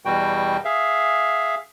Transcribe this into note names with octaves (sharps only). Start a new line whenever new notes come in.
E2 B2 G3 F#4 G5
G#4 E5 F5